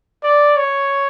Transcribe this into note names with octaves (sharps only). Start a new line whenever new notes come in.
D5
C#5